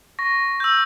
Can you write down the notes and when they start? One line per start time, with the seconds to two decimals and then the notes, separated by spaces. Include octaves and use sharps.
0.19 C#6 A#6
0.60 E6 G6